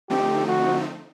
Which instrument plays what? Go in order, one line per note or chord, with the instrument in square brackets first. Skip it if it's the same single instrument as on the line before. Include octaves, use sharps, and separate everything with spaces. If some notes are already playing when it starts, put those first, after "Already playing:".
[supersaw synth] D3 F3 A3 C4 D#4 [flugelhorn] G4
[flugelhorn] F#4